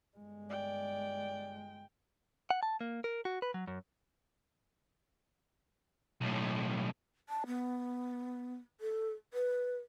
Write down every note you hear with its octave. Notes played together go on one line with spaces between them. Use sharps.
G1 G#3
D5 G5
F#5
A5
A#3
A#4
F#4
B4
F#3
F#2
B1 A2
A5
B3
A4
B4